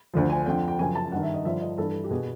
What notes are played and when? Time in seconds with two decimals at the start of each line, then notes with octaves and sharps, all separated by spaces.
0.14 D2 D3 F3
0.30 G#5
0.46 F2 D3 F3 G5
0.68 G5
0.79 F#2 C#3 F3 G#5
0.95 A5
1.12 G2 D#3 F#5
1.23 E5
1.34 D#5
1.45 G2 D3 F3 E5
1.61 D#5
1.78 G2 E3 A4
2.04 G4
2.10 B2 G#4